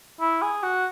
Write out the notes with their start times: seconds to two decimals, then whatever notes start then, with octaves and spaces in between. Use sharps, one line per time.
0.21 E4
0.42 G#4
0.63 F#4